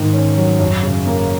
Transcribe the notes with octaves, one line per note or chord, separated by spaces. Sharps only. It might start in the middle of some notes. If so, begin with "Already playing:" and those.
Already playing: G#2 D#3
C#4
F#3
F#2
C#3
A#3